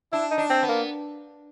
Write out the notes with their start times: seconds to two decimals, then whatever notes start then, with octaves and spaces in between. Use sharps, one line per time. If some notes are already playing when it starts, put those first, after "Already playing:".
0.12 D4 E4
0.31 D#4
0.38 D4
0.50 C4
0.63 B3
0.69 A#3